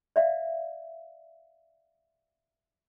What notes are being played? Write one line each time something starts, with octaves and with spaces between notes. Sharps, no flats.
D5 E5 F5